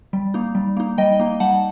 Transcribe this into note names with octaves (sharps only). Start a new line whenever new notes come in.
G3
A#3 D#4
G3
A#3 D#4
G3 D#5 G5
A#3 D#4
G3 F#5 A5